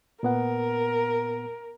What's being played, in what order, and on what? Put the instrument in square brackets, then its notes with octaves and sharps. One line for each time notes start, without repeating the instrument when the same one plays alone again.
[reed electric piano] A#2 B3 F#5 [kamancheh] A#4